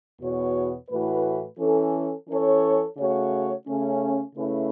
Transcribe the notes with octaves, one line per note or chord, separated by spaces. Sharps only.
E2 B2 B3 F#4 C#5
A2 E3 A3 F#4 B4
E3 C#4 A4
E3 C#4 A4 C#5
C#3 A3 F#4 C#5
C#3 A3 C#4
C#3 A3 C#4 E4 B4